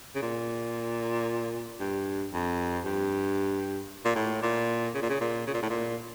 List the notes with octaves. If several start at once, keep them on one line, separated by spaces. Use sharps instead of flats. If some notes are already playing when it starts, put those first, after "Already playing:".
C#3
A#2
G2
F2
G2
A#2
A2
A#2
C#3
A#2
C#3
A#2
C#3
A#2
A2
A#2